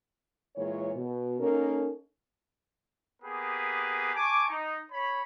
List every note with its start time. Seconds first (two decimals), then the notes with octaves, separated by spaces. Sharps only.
0.56 A#2 E3 G#3 C#5
0.95 B2
1.39 A#3 C#4 D#4 A4 A#4
3.22 A#3 B3 G4 G#4 B4
4.15 G#5 A5 C#6 D6
4.49 D#4
4.92 C#5 B5